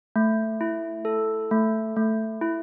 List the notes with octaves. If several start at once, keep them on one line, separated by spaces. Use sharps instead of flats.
A3
E4
A4
A3
A3
E4